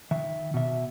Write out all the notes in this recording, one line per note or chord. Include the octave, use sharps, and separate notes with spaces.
D#3 E5
B2 E5